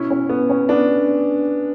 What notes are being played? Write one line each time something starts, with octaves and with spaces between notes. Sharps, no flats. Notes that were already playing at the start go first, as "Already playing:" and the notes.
Already playing: B2 C#4 E4
C#4
B3
C#4
B3 D4